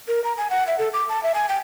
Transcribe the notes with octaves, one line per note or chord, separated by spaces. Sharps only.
A#4
A#5
G#5
F#5
E5
A4
D6
A5
E5
G#5
G5